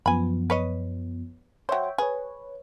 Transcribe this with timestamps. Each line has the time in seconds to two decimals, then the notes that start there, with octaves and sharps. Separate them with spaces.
0.06 F#2 F3 B3 G#5 B5
0.50 B4 C#5 D#5
1.69 F#3 C5 C#5 E5 G5
1.98 G#4 B4 C#5